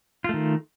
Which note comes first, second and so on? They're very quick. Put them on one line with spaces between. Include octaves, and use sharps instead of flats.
F4 A3 D#3